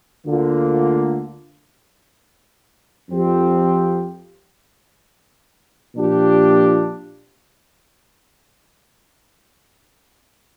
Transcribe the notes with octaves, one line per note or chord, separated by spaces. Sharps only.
D2 D3 A#3 F4
F2 F3 C4 G4
A#2 F3 D4 G4